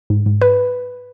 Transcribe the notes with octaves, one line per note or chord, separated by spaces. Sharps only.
G#2
G#2
B4